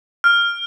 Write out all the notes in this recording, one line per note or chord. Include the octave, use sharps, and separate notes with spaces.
F6